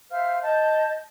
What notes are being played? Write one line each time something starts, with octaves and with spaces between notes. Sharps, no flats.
C5 E5 F5 F6
D#5 A5 G6